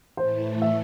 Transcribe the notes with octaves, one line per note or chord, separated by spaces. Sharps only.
A2 E3 A3 C5
E5